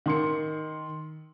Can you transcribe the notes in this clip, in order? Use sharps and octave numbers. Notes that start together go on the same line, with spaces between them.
D#3 C6 C#7